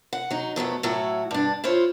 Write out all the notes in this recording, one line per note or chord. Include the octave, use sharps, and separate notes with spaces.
F#5
F#3 D#4
F2 F#3 A3 B3
A2 F#3 E4 F#4
G2 D4
E4 F4 C5 C#5